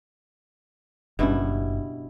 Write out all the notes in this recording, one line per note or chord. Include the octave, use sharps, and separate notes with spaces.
F#1 G2 B2 C#4 E4